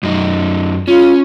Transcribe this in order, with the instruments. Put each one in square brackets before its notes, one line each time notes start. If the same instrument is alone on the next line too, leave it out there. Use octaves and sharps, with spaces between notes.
[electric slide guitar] F#2 D#4
[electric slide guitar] C#4 [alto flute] F4